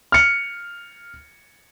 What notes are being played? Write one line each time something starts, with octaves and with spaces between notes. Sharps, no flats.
F6 C#7